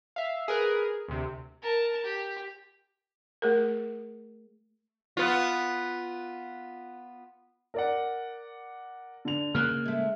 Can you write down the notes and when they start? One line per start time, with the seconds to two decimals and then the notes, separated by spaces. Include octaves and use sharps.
0.16 E5 F5
0.48 G#4 A#4 B4
1.08 D2 C3
1.62 A#4 A5
2.04 G4
3.42 A3 G#4 A#4
5.17 B3 F4
7.74 A#4 D5 F#5
9.25 D3 F7
9.55 C#3 A#3 F6 F#6
9.85 G#3 A3